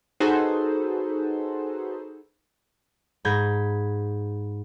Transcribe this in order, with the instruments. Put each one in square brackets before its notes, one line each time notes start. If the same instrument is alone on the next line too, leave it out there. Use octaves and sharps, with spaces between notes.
[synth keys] D#4 F#4 G#4 A4 B4 C5
[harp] G#2 B5 G6 G#6 A#6